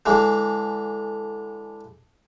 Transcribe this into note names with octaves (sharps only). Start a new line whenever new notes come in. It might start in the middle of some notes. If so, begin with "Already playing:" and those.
D3 E3 G#3